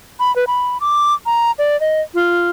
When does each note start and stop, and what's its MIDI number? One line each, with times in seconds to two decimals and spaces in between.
0.20 0.34 83
0.36 0.45 71
0.47 0.78 83
0.81 1.14 86
1.26 1.51 82
1.59 1.79 74
1.80 2.01 75
2.14 2.50 65